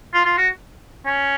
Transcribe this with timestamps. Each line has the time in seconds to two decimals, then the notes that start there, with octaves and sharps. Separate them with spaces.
0.14 F4
0.25 F4
0.38 F#4
1.06 C#4